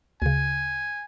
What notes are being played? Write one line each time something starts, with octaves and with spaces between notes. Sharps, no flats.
D2 C#3 G#5